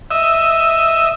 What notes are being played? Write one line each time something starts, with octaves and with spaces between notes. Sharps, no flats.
D#5 E5